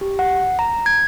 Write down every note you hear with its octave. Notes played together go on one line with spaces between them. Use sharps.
G4
F#5
A#5
G#6